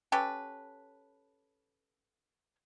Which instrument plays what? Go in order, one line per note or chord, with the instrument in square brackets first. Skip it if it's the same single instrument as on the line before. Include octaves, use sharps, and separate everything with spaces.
[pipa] C#4 G4 A4 B4